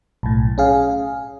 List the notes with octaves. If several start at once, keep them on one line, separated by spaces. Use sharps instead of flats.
B1 A2
C#4 G#4 F5